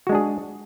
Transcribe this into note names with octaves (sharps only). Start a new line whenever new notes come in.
G#3 D4 F#4 G#4